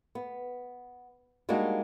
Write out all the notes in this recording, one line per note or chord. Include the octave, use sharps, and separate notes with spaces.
B3
G3 G#3 A#3 D4 D#4 F#4